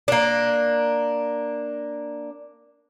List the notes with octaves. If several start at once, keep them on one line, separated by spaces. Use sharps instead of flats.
A#3 D4